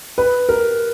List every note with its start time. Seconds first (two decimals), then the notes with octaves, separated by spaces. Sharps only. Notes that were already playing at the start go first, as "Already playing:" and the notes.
0.18 B4
0.49 A#4